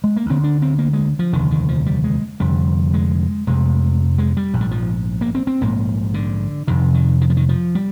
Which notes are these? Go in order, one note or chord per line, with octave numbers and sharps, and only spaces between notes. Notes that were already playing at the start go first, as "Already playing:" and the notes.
G#3
A#3
D2 D3 C4
D4
C4
A#3
G#3
F3
F1 D#2 D3 D#3
D#3
F3
G3
G#3
F1 F2 D3 G3
G#3
F1 F2 C3 G#3
G#3
G3
A#1 G#2
G3
F3
A#3
C4
C4
A#1 G#2 A#3
D3
F1 F2 C3 D#3
D#3
D#3
F3
D#3
F3
G3